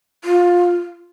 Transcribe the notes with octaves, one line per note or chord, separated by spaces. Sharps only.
F4